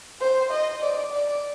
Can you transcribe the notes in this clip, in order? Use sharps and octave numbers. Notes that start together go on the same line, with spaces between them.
C5
D#5
D5
D5